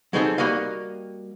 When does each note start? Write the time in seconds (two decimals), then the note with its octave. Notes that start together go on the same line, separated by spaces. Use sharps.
0.13 F#3 G#3 C4 D#4 G4 A4
0.38 G3 A#3 F#4 D#5 F5